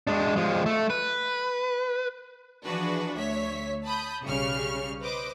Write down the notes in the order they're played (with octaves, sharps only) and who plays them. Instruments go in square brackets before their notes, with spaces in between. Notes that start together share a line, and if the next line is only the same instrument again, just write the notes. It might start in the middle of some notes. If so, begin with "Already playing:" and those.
[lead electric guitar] G#3 D4
F3 G#3
A3
B4
[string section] E3 F3 D4 F#4 G#4 B4
D2 C#5 E5 B6
A5 B5 D#6 G6
B1 C#3 G3 C#6 F6
B4 C5 D#5 D6